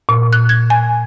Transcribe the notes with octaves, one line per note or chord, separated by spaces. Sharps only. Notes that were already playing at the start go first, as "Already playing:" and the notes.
A#2
F#6
G#6
G#5